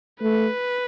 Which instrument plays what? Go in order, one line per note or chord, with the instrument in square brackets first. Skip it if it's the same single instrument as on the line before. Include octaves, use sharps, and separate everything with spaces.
[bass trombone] A3 [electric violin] B4